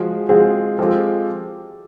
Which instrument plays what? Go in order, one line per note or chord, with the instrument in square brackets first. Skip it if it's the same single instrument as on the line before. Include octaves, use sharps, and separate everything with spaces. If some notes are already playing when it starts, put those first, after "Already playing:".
Already playing: [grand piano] F3 G#3 [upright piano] F#4 G#4
[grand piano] F3 G#3 C4 F4 [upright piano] F#4 G#4
[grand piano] F3 G#3 C4 F4 [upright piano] G4 A4